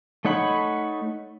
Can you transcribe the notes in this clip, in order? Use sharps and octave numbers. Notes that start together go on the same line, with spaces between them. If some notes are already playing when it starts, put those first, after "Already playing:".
A3 D#4 C#5 F#5 B5